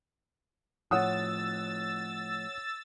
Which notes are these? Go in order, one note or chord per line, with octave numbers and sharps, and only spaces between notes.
A2 F3 C#5 F#5 D#6 E6 A6